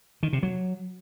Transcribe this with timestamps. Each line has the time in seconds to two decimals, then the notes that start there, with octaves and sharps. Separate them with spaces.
0.23 D#3
0.33 C3
0.43 F#3